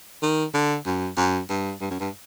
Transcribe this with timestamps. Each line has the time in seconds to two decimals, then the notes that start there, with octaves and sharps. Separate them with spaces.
0.22 D#3
0.54 D3
0.86 F#2
1.17 F#2
1.50 G2
1.81 G2
1.91 F#2
2.00 G2